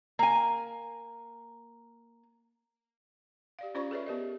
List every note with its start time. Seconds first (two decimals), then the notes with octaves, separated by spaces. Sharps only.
0.19 A#3 G#5
3.59 G4 D5 F5
3.75 C#4 F4 C5 D5 B5 C#6
3.91 G#4 A4 B4 C#5 D5 E5
4.06 B3 G4 A#4 D5 D#5